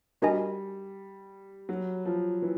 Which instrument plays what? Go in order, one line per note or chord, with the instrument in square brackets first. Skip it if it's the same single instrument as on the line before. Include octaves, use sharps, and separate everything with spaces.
[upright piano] G3 [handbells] D4 F#4 A#4 D#5 G#5
[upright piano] F#3
F3
E3